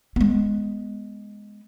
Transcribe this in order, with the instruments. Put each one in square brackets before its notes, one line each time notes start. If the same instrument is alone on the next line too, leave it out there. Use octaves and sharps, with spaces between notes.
[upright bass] G#3 B3